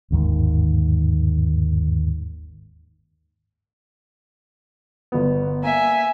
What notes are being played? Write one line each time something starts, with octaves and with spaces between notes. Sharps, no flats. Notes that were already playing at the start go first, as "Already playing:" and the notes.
G1 D#2 G#2 D#3
G1 B3
A#3 E5 G#5